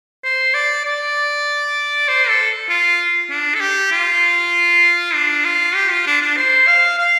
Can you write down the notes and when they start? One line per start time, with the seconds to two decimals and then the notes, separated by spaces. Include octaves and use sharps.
0.24 C5
0.54 D5
0.85 D5
2.08 C5
2.28 A4
2.69 F4
3.30 D4
3.55 A4
3.61 G4
3.92 F4
5.14 D4
5.45 F4
5.75 G4
5.91 F4
6.07 D4
6.22 D4
6.37 C5
6.67 F5
6.98 F5